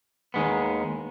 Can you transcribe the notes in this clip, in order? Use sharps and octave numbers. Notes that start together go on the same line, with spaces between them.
D#2 D#3 G#3 B3